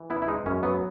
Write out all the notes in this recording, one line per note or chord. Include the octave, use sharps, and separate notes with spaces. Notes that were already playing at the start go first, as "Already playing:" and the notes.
Already playing: E3
B3 E4
E4
G#3 D#4
F#2 C#4
F#3 B3